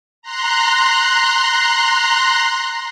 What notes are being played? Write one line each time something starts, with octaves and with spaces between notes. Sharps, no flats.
A#5 C6 F#6